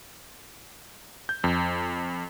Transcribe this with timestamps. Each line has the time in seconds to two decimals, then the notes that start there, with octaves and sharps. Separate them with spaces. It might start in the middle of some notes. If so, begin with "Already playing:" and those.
1.29 G6
1.44 F2